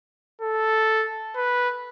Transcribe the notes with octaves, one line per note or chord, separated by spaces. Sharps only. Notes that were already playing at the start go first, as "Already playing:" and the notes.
A4
B4